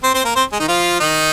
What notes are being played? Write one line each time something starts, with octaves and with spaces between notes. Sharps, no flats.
C4 C5
C4 C5
A#3 A#4
C4 C5
G#3 G#4
D#3 D#4
F3 F4
D#3 D#4